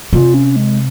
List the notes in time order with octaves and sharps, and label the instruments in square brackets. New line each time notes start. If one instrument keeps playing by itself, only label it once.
[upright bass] C3 [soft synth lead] F4
[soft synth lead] C#4
G#3